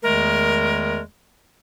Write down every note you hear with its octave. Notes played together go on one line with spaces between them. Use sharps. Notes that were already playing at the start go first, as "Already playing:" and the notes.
E2 D#3 G#3 A3 A#4